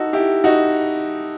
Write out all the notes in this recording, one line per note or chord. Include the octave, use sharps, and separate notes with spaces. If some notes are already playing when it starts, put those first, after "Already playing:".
Already playing: D#4 F#4 A4
E4 G4
D#4 F#4